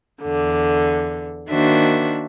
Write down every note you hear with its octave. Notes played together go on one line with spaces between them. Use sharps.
E2 D3
D#3 A#3 D4 F#4 C5 E5